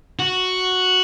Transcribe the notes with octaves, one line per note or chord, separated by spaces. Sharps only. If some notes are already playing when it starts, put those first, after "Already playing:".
F#4